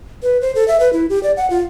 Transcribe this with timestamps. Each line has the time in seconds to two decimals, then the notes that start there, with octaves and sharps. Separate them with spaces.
0.23 B4
0.41 C5
0.55 A4
0.68 E5
0.80 B4
0.93 E4
1.10 G4
1.23 D5
1.37 F#5
1.50 F4